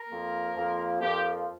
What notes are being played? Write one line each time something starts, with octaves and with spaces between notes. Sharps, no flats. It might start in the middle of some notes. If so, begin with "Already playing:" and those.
Already playing: A#4
F2 F3 A#3
F2 F3 A#3
F2 F3 A#3 G4